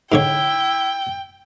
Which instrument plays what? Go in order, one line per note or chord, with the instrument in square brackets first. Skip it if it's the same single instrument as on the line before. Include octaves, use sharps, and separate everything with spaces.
[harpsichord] G#2 D3 C#5 [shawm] E4 [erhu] G5